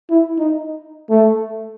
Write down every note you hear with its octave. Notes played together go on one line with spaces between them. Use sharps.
E4
D#4
A3